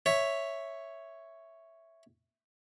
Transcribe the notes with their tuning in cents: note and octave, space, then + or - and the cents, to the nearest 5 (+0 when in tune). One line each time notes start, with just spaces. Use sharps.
C#5 +0 E5 +0